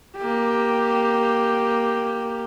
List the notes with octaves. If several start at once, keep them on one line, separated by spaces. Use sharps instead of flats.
A#3 G4